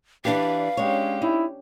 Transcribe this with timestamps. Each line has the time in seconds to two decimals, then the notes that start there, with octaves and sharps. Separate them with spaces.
0.25 E3 D4 G4 B4 D5 F5
0.77 G#3 C#4 D4 G4 C#5
1.22 D#4 E4